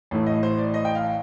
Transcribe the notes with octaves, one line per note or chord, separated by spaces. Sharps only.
A1 A2 A3
D#5
C5
D5
D#5
G5
F5